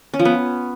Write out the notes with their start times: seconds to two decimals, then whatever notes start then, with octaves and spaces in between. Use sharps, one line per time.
0.14 C#4
0.19 F3
0.25 B3